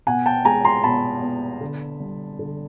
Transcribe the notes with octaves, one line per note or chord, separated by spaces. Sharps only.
B2 F#5 G#5
G5 A5
G#3 G#5 A#5
A#5 C6
B2 A5 B5
B3
D3
G3
D3